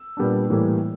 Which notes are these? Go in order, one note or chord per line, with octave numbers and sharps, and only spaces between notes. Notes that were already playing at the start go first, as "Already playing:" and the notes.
Already playing: E6
A#2 G3 B3 D4
A2 E3 G3 A#3